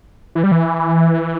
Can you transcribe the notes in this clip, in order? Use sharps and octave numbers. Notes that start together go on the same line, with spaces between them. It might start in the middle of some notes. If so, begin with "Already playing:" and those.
E3
G3
E3